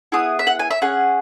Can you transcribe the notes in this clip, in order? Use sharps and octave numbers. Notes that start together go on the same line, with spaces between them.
B3 E4 G#4 D#6
E5
F#5
G#5
E5
C#4 G#4 F#5